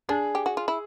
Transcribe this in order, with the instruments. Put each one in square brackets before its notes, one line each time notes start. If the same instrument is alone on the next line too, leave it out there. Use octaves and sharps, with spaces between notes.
[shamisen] D4 [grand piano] G#4
[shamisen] G4
F#4
F4
E4